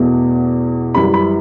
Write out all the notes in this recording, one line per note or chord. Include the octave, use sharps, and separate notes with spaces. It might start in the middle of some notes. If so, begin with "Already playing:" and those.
Already playing: E2 B2 A3
F#2 E3 G3 B5
B5